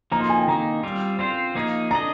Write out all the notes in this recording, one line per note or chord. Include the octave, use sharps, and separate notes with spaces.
F3 A#3 D#4 A#5
C6
G#5
G5
D#3 A#3 D#4 A#5
G3 C4 F4
C4 F4 C5 C6
F3 A#3 D#4 G#4
D4 G#4 D#5 A#5